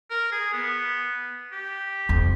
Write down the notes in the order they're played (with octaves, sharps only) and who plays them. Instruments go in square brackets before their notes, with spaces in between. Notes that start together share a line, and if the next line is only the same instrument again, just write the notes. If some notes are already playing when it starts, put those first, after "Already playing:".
[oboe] A#4
G#4
B3
G4
[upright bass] F2